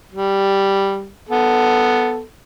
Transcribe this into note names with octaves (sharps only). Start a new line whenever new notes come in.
G3
B3 A4